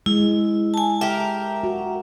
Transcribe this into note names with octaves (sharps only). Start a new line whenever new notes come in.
G#3 E4
G#5 A5
G4 A#4 E5
F#4